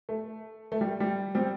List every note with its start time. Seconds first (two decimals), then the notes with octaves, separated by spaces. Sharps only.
0.09 A3
0.72 A3
0.81 G3
1.00 G3
1.35 G3 C4